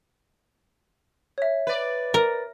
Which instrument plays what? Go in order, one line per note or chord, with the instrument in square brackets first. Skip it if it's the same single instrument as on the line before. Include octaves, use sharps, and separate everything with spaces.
[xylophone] C#5 E5
[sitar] B4 D5
[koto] A#4